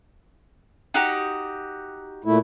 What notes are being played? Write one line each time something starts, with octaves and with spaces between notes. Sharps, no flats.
D#4 F#4 G4
A#2 A3 E4